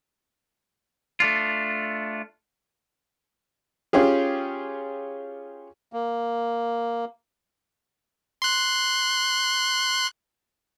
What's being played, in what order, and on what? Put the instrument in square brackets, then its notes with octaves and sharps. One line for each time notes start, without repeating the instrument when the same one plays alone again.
[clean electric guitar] A3 D4 F4
[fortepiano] C#4 F4 G4 G#4
[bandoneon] A#3
[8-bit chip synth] C6 F#6